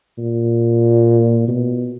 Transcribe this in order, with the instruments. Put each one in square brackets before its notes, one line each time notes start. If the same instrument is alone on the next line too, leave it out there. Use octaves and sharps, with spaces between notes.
[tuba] A#2
B2